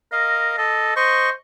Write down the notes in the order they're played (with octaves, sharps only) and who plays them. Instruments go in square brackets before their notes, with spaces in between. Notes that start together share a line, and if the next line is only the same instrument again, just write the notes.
[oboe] A#4 [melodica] D#5 F5
[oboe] A4 [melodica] D#5
[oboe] C5 [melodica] D#5 C#6